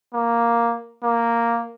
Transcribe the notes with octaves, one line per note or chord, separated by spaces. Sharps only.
A#3
A#3